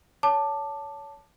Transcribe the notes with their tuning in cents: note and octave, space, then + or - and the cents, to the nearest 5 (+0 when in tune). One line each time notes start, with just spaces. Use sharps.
C#5 +20 A5 +0 D6 +15